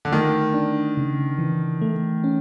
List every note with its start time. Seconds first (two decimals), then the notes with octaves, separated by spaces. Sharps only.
0.05 D3
0.12 D#3 A3
0.54 D4
0.97 C#3
1.39 E3
1.81 A3
2.24 C#4